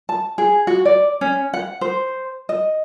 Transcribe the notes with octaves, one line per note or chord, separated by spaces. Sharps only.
A5
G#4
F#4
D5
C#4
F#5
C5
D#5